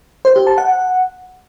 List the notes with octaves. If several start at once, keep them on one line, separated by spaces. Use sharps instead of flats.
C5
G4
A5
F#5